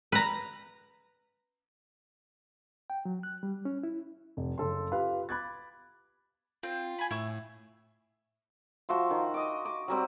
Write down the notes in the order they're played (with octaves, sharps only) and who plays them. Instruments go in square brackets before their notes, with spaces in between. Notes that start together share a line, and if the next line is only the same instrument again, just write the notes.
[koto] B4 A#5
[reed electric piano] G5
F#3
F#6
G3
C#4
E4
[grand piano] F1
F#1 C#3 A4 C6
F4 G4 B4 F5 B5
B5 D6 F#6 G#6 A6
[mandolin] C4 [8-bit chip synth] F4
[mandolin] G#5 B5
[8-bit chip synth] A2 [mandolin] E4 C#6 E6
[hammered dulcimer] F3 F#4 E5 C6
D#3
D#5 D6
D6
F#3 G3 C4